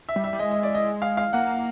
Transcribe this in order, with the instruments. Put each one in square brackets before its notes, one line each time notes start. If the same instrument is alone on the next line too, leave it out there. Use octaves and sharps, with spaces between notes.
[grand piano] E5
[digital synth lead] G3
[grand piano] E5
[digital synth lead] G3
[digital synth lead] G#3 [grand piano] D#5
[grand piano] D#5
D5
D#5
F5
F5
[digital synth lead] A#3 [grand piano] F#5